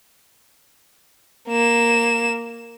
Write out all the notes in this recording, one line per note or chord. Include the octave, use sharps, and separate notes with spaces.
A#3 E7